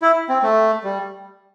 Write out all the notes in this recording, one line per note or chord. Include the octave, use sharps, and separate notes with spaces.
E4
C4
A3
G3